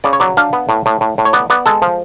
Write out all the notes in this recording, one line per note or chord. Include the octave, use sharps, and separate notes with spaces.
C#3 D5
C#5
F#3 D5
D4 F5
B3
A2
A2
A2
A2
C#5
B3 D5
B3 D5
G#3 A4
F3